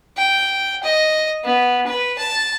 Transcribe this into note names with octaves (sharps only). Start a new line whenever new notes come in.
G5
D#5
B3
B4
A5